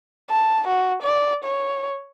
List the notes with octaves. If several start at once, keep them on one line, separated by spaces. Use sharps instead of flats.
A5
F#4
D5
C#5